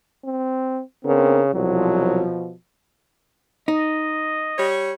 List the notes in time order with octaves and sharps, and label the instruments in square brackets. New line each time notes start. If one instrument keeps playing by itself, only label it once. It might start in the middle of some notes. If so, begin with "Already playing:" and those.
[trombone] C4
[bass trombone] C#3 [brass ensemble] B3 D4 A#4 [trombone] C4
[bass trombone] C2 [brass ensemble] B2 F3 [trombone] F#3
[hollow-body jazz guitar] D#4 [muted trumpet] D#5
[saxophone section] G3 C#5